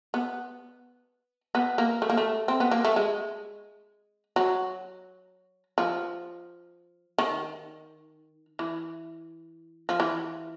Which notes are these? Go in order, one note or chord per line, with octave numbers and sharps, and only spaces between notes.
B3
B3
A#3
A3
A#3
A3
C4
B3
A#3
A3
G#3
F#3
F3
D#3
E3
F3
E3